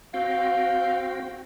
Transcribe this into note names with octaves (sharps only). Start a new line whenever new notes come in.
C4 F#4 F5 G5